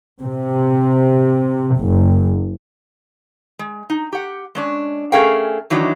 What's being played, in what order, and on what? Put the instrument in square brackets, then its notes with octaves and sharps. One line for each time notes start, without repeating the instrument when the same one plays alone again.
[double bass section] C3
F#1
[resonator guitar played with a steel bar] G#3
D#4
G4 F#5
G#3 C#4 D4
A3 C#4 G#4 A#4 F5 G5
D#3 E3 F#3 D4 D#4